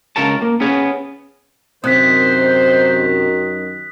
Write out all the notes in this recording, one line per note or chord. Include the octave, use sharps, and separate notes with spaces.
C#2 C#3 F4 A#4 C#5 A5
A#3
B3 C#4 G#4 C#5
F#2 C3 D#3 C5 D#6 F#6 B6